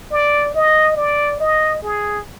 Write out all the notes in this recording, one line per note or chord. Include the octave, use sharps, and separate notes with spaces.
D5
D#5
D5
D#5
G#4